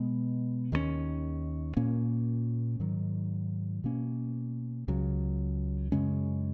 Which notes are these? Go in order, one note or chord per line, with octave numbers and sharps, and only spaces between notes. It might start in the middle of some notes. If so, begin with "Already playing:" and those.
Already playing: B2 G#3 B3
D#2 D#3 G#3 C#4
A#2 A#3 C#4
G#2 D#3 F#3
B2 A#3 C#4
C#2 C#3 F#3
F#2 C#3 G#3 C#4